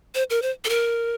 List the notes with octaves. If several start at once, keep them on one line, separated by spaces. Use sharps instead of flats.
C5
A#4
C5
A4
A#4